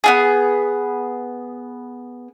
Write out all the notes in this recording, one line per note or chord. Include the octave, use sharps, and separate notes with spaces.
B3 F4 G#4